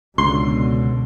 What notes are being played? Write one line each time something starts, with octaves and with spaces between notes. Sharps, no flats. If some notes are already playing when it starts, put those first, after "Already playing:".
C#2 B2 D3 C6